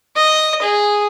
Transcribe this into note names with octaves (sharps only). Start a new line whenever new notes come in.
D#5
G#4